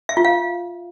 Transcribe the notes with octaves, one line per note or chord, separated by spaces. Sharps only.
E5
F4
F5